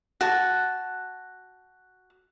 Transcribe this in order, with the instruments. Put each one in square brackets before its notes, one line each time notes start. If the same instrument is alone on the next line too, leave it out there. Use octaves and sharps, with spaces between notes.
[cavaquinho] F#4 A5